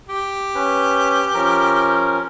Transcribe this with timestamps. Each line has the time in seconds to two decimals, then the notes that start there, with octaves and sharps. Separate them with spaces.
0.08 G4
0.55 C#4 B4
1.34 F3 C#4 A#4